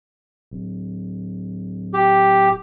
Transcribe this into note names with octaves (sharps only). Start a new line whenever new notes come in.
D1
G4